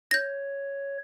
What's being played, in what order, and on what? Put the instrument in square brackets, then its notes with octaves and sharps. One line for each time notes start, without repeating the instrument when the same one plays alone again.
[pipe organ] C#5 [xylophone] G6 A#6